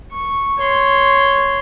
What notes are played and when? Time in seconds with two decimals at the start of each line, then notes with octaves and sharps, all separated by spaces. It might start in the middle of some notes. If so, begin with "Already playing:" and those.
0.12 C#6
0.59 C#5 C6